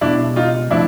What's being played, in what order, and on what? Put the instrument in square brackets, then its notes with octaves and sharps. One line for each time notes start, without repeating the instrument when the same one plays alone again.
[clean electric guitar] C#2 B2 G3 [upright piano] D4 E4
[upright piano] D#4 F4
[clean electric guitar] F3 A3 C4 [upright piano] D4 E4